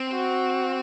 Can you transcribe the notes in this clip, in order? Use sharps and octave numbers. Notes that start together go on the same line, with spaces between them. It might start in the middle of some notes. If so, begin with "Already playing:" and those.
Already playing: C4
F#4